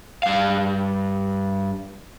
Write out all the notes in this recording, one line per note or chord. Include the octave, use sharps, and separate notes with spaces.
G2 F5